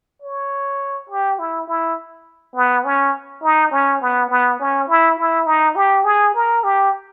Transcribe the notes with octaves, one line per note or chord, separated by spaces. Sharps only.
C#5
G4
E4
E4
B3
C#4
D#4
C#4
B3
B3
C#4
E4
E4
D#4
G4
G#4
A#4
G4